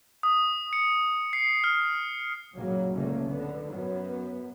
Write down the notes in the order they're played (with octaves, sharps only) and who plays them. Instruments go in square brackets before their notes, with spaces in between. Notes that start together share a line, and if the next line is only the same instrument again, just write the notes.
[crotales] D#6
C#7
C7
F6
[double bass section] A#1 F#2 C#3 F#3 A#3
F#1 C#2 D3 A3 A#3 C#4
D3 B3
F#2 F#3 B3